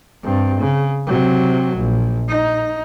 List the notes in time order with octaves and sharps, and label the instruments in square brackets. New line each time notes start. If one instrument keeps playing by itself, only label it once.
[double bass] G2 C4
C#3
C3 F#3
A#1
D#4